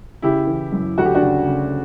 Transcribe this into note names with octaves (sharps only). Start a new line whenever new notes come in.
C#3 E4 G4
E3
F#2
D2 F#4
G4
D4 F#4
C#3
C#3